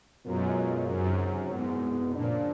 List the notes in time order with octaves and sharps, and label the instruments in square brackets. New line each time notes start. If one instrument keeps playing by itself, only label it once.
[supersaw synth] F#2 [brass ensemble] B2 G#3 C#4 F4 A#4
[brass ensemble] C#2 C3 D#3 F#3 [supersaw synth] F#2
[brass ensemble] C2 B2 G#3 B3 [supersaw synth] G#2
[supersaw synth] A#2 [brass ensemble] C#3 F3 A#3 D4